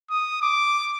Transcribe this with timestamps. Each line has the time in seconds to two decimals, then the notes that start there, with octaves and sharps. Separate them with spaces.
0.10 D#6
0.42 D6